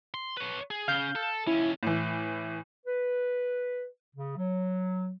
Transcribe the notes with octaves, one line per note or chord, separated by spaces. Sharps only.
C6
B4 C#5
G#4
C#3 F5 G6
A4
D#2 C#4 E4
A2 E3
B4
C#3
F#3